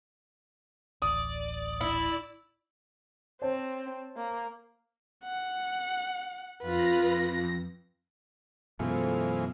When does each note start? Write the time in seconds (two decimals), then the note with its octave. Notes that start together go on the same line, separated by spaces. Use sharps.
1.02 D1 A1 D5 D#6
1.81 E4
3.42 C4 C5 C#5 A5
4.16 A#3
5.24 F#5
6.62 F2 F4 B4 A#6
8.79 F#2 B2 E3 F3 G#3 A3 F4